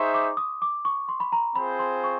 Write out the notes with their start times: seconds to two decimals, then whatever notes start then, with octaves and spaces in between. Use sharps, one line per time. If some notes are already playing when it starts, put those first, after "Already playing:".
Already playing: D#4 G#4 C5 E5 C6 C#6
0.14 D6
0.37 D#6
0.62 D6
0.85 C#6
1.09 C6
1.20 B5
1.32 A#5
1.55 C4 F4 G#4 C5 B5
1.79 C6
2.04 C#6